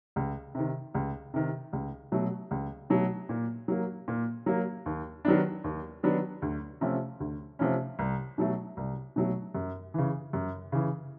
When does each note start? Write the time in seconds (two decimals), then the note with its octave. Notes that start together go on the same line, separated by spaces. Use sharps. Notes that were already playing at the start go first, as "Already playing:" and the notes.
0.16 C#2
0.55 C3 D#3
0.94 C#2
1.34 C3 D#3
1.73 C#2
2.12 B2 F#3 A3
2.51 C#2
2.90 B2 F#3 A3
3.29 A#2
3.68 F#3 A#3
4.08 A#2
4.46 F#3 A#3
4.86 D#2
5.25 D#3 F#3 B3 D4
5.64 D#2
6.03 D#3 F#3 B3 D4
6.42 D2
6.81 C3 F3 A3 C#4
7.20 D2
7.59 C3 F3 A3 C#4
7.99 C2
8.38 B2 F#3 A3
8.77 C2
9.16 B2 F#3 A3
9.55 F#2
9.94 C#3 E3
10.33 F#2
10.72 C#3 E3